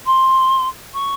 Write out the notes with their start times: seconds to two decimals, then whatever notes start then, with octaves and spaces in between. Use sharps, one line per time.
0.06 C6
0.94 C#6